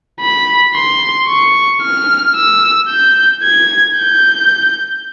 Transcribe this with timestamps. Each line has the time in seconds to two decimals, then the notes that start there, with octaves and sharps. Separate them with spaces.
0.21 B5
0.75 C6
1.28 C#6
1.82 F6
2.35 E6
2.89 G6
3.44 G#6
3.98 G6